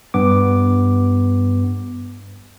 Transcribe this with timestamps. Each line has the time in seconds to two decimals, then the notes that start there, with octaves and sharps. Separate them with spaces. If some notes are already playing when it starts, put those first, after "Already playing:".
0.14 G2 B3 D6